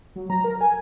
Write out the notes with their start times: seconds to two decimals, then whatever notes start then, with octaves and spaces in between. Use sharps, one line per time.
0.16 F#3
0.30 A#5
0.44 A#4
0.61 G#5